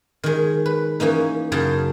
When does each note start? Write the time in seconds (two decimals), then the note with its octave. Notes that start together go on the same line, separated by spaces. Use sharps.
0.24 D#3 G#3
0.66 B4
1.00 E3 A#3 C#4 D#4
1.52 F#2 C#3 G#4 G5 A5